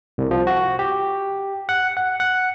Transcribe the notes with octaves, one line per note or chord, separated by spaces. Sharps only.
C2
F3
F#4
G4
F#5
F#5
F#5